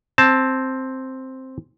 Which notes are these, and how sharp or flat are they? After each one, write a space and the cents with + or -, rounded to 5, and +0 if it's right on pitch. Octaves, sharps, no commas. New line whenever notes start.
C4 +0 A5 +0